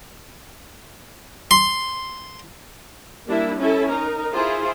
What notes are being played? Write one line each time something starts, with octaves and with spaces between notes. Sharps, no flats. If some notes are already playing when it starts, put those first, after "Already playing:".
C6
G3 A#3 D4 E4
C#4 E4 A4
D#4 A#4
E4 F4 G#4 C5